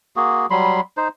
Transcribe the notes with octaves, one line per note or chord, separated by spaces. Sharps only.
A#3 F#4 G#4
F#3 G3 B5 C6
D#4 C5